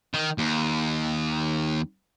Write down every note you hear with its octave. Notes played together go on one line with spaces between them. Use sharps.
D#3
D#2